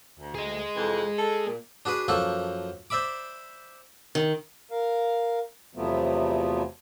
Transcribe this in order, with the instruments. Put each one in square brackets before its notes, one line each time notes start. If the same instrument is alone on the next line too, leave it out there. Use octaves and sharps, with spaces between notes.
[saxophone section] D2
[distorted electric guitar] G#4 D#5
[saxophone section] F2 C3 E3
A4
A#2
[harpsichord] D4 F#4 G#4 B4
F#2 F3 A#3 A4 F#5 C#6
C5 D5 E5 B5 D6
[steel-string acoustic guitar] D#3
[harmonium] A#4 F5
E2 C3 F3 F#3 A3 B3